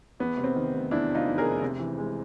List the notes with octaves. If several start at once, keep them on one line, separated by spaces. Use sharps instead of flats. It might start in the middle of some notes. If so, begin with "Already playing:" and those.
E2 B3
C3
C4
D#3
F1
E2 D4 E4
C3
D#4 F4
D#3
G#4 A#4
F1
C3
E3
G#3